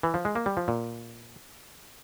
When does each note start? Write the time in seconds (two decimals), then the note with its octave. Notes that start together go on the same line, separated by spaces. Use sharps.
0.03 E3
0.14 F3
0.25 G#3
0.36 A#3
0.46 G3
0.57 F3
0.68 A#2